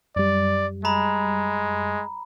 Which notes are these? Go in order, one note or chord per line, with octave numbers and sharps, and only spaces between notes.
F#2 G3 D5
G#3 A#5 B5